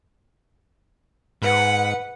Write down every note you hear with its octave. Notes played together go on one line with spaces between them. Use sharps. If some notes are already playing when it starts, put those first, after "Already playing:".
G#2 B4 F#5